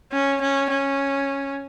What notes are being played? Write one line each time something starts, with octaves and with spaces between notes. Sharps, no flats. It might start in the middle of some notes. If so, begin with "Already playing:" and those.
C#4
C#4
C#4